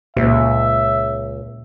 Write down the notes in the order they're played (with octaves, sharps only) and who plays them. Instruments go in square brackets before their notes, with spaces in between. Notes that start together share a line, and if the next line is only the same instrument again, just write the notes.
[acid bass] C#2 [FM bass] A#2 [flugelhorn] E5